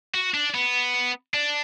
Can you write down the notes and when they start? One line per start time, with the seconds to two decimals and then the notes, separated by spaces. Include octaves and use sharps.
0.14 F#4
0.34 D4
0.54 B3
1.34 D4